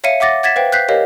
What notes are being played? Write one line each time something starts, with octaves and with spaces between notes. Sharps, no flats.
C#5 E5 F5 C#7 D#7
E5 F#5 D6 A6 A#6
F#5 G#6 A6 B6 E7
B4 C5 F5 G5
F#6 G6 B6 C7
G4 A#4 C#5 D#5 F5